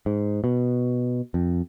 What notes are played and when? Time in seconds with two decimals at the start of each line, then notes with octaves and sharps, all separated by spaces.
0.06 G#2
0.44 B2
1.34 F2